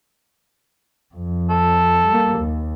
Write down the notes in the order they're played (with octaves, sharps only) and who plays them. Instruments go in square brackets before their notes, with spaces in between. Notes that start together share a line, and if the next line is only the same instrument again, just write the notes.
[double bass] F2
[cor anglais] A4
[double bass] G3 A#3
D#2